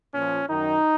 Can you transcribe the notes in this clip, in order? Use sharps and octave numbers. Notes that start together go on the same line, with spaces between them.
A#2 F3 C#4
F#2 D#3 D#4